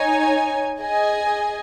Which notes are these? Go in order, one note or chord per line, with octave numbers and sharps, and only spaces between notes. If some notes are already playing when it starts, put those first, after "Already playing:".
Already playing: D#4 C#5 G#5
G#4 D#5 G#5